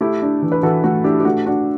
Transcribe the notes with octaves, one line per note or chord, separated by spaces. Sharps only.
A3 E4 G4
D4
E3
B4
E3 F#4 A4
A3 F#4
D4 E4 G4
G4
A3 F#4
D4 F#4